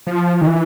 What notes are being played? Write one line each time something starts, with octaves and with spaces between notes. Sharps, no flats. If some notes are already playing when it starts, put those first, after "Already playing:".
F3
D#3
E3